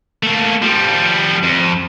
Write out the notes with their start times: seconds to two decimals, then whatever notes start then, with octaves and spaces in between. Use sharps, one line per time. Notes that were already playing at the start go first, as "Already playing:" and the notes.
0.23 A3 A#3
0.62 F3 G3
1.44 F2